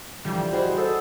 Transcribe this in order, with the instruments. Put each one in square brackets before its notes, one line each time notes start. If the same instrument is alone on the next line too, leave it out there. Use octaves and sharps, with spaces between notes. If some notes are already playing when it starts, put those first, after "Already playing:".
[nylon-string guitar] D3 E3 F3 [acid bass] G3 [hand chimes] G6
[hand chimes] E4 D#5 B5 [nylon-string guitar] F#4 G#4 [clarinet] C5
[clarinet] A4 [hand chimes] F#5 D#6